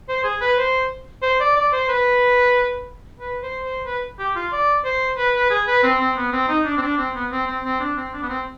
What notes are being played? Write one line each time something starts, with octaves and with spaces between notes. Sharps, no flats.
C5
G#4
B4
C5
C5
D5
D5
C5
B4
B4
C5
C5
B4
G4
F4
D5
C5
B4
B4
G#4
B4
C4
C4
B3
C4
D#4
D4
C4
D4
C4
B3
C4
C4
C4
D4
C4
D4
B3
C4